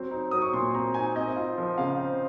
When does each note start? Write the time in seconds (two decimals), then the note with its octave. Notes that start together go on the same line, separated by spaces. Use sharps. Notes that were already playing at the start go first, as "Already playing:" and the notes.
Already playing: F#3 C4
0.11 D#4
0.31 F#3 D#6
0.42 C#6
0.53 A#2 C6
0.74 C4 A#5
0.94 D#4 G#5
1.15 C4 D#5
1.36 F4
1.58 F3
1.78 C#3 F5
1.98 C4